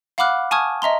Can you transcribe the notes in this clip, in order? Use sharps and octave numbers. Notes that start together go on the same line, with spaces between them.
F5 F#5 B5 D6 F6 F#6
G#5 A5 C#6 D#6 F6 G#6
D#5 E5 A#5 C6